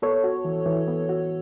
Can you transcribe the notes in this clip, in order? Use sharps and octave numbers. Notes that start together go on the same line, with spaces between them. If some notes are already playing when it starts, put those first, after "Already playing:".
B3 A4 C#5
F#4
E3
E3
B3
F#4